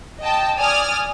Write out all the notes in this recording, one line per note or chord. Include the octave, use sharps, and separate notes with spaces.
D#5 G5 A5
D5 G#5 D#6 F6